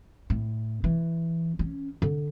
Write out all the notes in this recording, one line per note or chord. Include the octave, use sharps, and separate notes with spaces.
A2
E3
C#4
D3